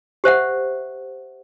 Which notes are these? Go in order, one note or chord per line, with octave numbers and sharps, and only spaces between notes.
G4 C5 E5 F#5